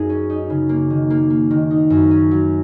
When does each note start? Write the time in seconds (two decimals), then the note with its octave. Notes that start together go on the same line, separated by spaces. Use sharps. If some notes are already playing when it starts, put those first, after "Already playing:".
Already playing: F#2 D#4 G#4
0.09 C#4
0.30 D#4
0.50 C#3
0.69 A#3
0.90 D#3
1.10 A#3
1.30 A#3
1.51 D#3
1.71 D#4
1.90 F#2
2.11 C#4
2.31 F#3